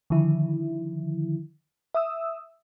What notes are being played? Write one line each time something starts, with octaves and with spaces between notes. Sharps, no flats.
D3 D#3 F3 E4
E5 D#6 E6